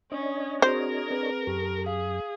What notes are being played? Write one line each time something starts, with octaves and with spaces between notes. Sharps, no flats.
C#4 D4 C#5 D#5
C4 F#4 G#4 A#4 C5
C4 G#4 B4
F#2 G4 A4
G#4 F5